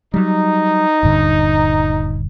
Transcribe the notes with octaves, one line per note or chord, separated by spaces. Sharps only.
F#3 G3 D#4
D#1 G2 D3